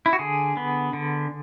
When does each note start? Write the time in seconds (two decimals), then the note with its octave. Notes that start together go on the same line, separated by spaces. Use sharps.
0.06 E4
0.13 F#4
0.19 D3 G#4
0.57 B3
0.93 D3